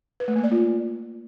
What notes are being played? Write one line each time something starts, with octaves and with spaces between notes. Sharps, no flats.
B4
A3
A#3
D5
F4